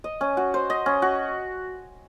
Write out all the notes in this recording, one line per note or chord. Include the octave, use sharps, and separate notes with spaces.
D#5
C#4
F#4
C5
D#5
C#4
F#4